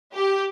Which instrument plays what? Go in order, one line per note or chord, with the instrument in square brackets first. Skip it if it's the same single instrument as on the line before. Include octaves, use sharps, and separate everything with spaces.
[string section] G4